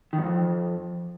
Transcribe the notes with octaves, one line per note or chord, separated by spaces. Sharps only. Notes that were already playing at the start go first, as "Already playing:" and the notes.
D#3
F#2
F2